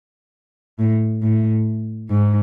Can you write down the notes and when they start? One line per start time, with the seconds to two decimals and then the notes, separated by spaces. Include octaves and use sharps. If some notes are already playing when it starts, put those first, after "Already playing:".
0.79 A2
1.22 A2
2.10 G#2